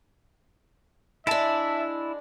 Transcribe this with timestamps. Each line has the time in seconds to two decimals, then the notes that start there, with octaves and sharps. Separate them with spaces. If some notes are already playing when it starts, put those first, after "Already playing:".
1.27 G#3 D4 E4 E5 A5